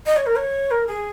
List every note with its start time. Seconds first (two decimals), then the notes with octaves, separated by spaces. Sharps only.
0.06 D#5
0.16 C#5
0.26 A#4
0.37 C#5
0.71 A#4
0.87 G#4